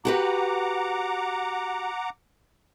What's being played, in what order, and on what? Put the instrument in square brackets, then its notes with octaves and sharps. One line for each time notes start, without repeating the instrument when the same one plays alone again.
[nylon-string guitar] F#4 G4 B4 [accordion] F#5 A#5 D6